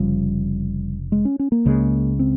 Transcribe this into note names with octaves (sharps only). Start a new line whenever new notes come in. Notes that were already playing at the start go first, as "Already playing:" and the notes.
Already playing: F1 C#3 F3 G3
G#3
C#4
C#4
A#3
C#2 C#3 G#3
C4